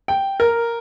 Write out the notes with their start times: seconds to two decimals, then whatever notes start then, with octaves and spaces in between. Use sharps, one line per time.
0.08 G5
0.40 A#4